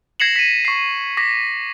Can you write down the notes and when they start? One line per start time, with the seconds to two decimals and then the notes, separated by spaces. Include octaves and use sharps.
0.20 G#6 A#6 C7 C#7 E7 F#7
0.36 B6 D#7
0.65 C#6 C7
1.17 D6 A#6 B6